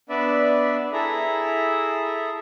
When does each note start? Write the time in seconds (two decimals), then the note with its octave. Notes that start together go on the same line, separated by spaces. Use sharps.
0.10 B3 D4 B4 D5 E5
0.93 E4 G#4 A4 E5 A#5